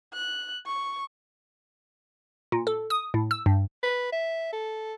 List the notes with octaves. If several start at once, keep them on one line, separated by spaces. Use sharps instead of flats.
F#6
C#6
A#2
A4
D#6
A2
E6
G2
B4
E5
A4